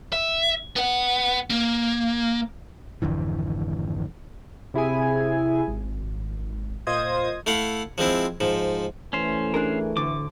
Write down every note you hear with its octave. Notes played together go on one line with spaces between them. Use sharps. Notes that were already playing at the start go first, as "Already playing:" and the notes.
E5
B3 F#5
A#3
G#1 F2 D3 E3
C3 E4 G#4 G#5
G#1
A#2 F4 C5 D#5 D#6 G#6
A3 E4 F5 F#5
F3 G#3 C4 E4
G#2 F3
E3 A3 C#4 C5
D4 G#4 A#4
D2 A2 D3 D6